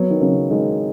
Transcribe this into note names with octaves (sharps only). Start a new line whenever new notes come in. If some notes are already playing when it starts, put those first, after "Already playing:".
Already playing: F#3 B3
D#3
C#3 F#3
D#3 G#3